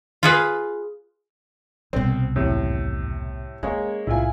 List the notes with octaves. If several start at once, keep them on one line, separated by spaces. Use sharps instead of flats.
F4 G#4 B4
C2 B2 C4
G#1 E2 A2 C3
G#3 A#3 C#4 G#4 C#5
C2 A2 E4 F4 G#5